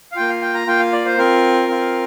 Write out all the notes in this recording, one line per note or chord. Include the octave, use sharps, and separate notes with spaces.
F5
A#3 F4 G5
F5
G5
A#5
A#3 F4 G5
F5
D5
C5
C4 F4 A#4
C4 F4